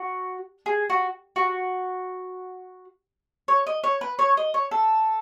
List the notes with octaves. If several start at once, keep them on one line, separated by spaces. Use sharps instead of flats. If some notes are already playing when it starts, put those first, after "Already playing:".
Already playing: F#4
G#4
F#4
F#4
C#5
D#5
C#5
B4
C#5
D#5
C#5
A4